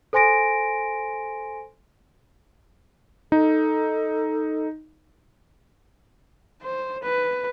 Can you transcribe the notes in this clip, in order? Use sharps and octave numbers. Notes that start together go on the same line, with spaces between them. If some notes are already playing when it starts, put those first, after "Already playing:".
A4 C5 G#5 C6 A#6 D7
D#4 A4
C5
B4